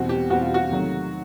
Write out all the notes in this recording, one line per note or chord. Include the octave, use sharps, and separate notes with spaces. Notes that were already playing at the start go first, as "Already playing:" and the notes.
Already playing: E2 B2 G3 C4 F#4
G4
E2 B2 G3 C4 F#4
F4
F#4
C3 D#3 F#3 A3